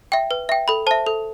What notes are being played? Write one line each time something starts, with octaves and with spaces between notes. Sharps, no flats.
E5 G5
B4
E5 G5
A4 B5
C5 E5 A5
A4